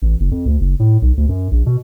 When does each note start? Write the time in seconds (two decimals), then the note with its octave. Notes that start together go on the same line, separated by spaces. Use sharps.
0.02 A1
0.20 F#1
0.31 F2
0.46 D2
0.60 F#1
0.79 A2
1.02 B1
1.17 D2
1.29 F#2
1.51 A#1
1.66 B2